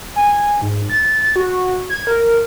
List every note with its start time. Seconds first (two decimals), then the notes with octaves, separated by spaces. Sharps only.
0.16 G#5
0.62 G#2
0.90 A6
1.36 F#4
1.90 G#6
2.07 A#4